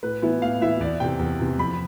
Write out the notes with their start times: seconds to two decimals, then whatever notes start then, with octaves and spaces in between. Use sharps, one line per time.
0.03 A2 B4
0.22 E3 B3 E4
0.42 A2 F5
0.61 E3 B3 E4 E5
0.80 E2 D5
1.00 C3 E3 G5
1.19 E2
1.40 C3 E3
1.58 F2 B5